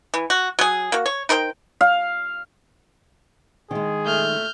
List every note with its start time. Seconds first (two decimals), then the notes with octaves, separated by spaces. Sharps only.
0.14 E3
0.30 F#4
0.59 F#3 G#4
0.92 A#3 F#4
1.06 C#5
1.29 D#4 A#4 C5 G5
1.81 F5
3.71 D#3 G#3 G#4
4.06 A#2 A3 F6 G6